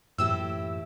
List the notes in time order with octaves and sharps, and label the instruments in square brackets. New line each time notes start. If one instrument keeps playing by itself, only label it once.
[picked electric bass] F#2 E3 [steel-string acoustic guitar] A2 E4 G4 [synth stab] E6